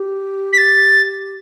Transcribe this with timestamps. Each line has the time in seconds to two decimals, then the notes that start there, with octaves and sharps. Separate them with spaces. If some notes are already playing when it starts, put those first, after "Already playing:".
Already playing: G4
0.53 B6
0.58 A6